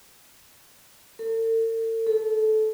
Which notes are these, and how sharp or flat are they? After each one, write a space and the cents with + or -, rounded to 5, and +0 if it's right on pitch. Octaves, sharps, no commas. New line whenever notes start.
A4 +45
A4 -20